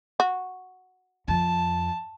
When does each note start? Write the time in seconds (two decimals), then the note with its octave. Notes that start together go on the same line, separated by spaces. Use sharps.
0.20 F#4
1.28 F2 A5